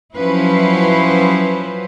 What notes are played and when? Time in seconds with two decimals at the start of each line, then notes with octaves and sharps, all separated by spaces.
0.13 F3 F#3 C#4 E4 B4 C5